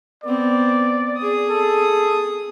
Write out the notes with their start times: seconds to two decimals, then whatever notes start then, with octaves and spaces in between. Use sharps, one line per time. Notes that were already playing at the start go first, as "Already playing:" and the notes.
0.24 B3 C4 D5
1.17 G#4 D#6
1.50 A4